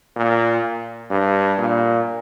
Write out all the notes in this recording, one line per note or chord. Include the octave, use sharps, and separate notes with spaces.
A#2
G2
A#2